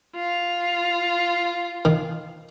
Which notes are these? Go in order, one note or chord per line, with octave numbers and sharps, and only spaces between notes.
F4
D#3